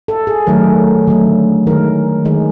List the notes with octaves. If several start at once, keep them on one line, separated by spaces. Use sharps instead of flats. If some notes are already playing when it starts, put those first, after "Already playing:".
A4
G#4
D#3 F#3 A3 A#4
D3 F#3 A3
D#3 G#3 A#4
D#3 G#3